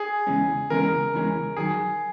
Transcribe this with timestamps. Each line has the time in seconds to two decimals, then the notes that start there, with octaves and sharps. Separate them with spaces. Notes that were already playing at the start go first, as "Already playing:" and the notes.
Already playing: G#4
0.27 E2 C#3 E3 G#3 C#4
0.70 E2 C#3 E3 G#3 C#4 A#4
1.13 E2 C#3 E3 G#3 C#4
1.57 D#3 F#3 G#4